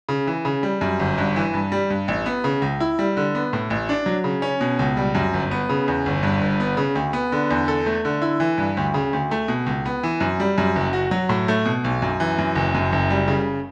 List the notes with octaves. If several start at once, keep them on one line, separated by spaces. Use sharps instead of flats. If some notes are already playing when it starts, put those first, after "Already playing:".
C#3
E3
C#3
G3
F#2
G1
G2
E3
G2
G3
G2
A1
B3
C#3
C#2
E4
G3
D3
B3
A2
A1
D4
F#3
C#3
C#4
B2
C#2
G3
F#2
G1
B3
C#3
E2
G1
G2
G1
B3
C#3
D2
B3
D3
E2
A4
A3
D3
E4
E3
G2
D2
C#3
D2
A3
B2
C#2
B3
E3
F#2
G3
F#2
F#1
F#4
F#3
A2
A3
B2
B1
F#2
E3
F#2
F#1
F#2
F#1
G3
C#3